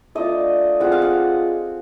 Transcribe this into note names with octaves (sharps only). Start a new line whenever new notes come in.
A3 D4 F4 D#5
G#3 C4 F4 F#5
F5
F#5